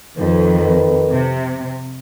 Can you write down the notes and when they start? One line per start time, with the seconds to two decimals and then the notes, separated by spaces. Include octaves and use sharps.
0.17 F2 D#3 A4 B4
1.12 C3